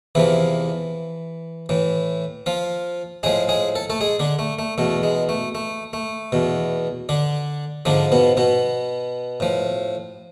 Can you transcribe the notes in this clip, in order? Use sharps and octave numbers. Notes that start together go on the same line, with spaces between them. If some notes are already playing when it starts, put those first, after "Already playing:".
E2 C3 E3 F3 E4
A2 E3
F3 F4
A2 F3 G#3 G#4
G#3 G#4
A4
A3 A4
G#3 G#4
D3 D4
A3
A3
E2 B2 A3
G#3
A3
A3
A3
E2 B2
D3 D4
G#2 D3 F3 D4
B2 B3
B2 B3
A2 F3